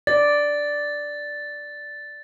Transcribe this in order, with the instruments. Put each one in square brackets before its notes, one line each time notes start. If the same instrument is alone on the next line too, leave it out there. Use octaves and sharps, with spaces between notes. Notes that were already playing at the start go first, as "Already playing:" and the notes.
[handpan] D5 [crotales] A6